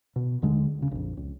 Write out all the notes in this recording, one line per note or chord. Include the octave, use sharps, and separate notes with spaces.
B2
D#2 D3 G#3
E1 C#3
A#1 F2
C#2